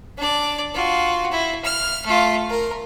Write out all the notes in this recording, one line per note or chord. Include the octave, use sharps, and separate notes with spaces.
D4 D5
F4 F#4
E4
F6
A3 F4
A#4